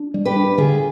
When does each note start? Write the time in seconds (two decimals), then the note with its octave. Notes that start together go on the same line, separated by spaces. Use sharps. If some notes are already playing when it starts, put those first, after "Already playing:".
Already playing: D4
0.14 G3
0.25 G4 B4
0.36 D4
0.58 D3 F4 G#4